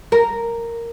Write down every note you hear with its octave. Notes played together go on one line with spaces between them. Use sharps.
A#4